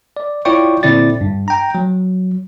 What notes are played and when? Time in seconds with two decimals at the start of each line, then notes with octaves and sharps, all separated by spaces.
0.17 D5
0.45 E4 F4 C#5 D5 G5 C#6
0.83 A#2 D3 C4 E4 D5 A6
1.21 G2
1.48 G5 A#5
1.75 F#3